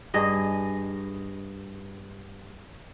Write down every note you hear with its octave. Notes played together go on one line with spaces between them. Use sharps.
G2 G#4 D#5